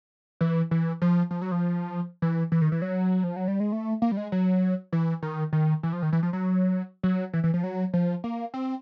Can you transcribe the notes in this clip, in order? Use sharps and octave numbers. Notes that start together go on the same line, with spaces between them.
E3
E3
F3
F3
F#3
F3
E3
E3
D#3
E3
F#3
F3
F#3
G3
G#3
A3
A#3
G3
G#3
F#3
E3
D#3
D#3
E3
F3
D#3
E3
F3
F#3
F#3
E3
E3
F3
F#3
F3
A#3
C4